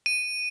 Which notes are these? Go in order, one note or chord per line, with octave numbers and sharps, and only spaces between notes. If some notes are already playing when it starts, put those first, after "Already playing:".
D#7